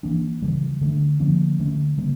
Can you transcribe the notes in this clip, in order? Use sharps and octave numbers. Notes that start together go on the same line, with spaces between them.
E3 A#3 D4
C#3 E3 G3
D3 A3 D4
D3 F3 A#3 C#4
D3 A3 C#4
C#3 G3 A#3